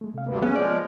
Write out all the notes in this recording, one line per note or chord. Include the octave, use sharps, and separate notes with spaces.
G#3 A3
C3 F5
D2 G2 A#3 B4
B3 C#4 G#4 C#5
F3 G#3 D5
F6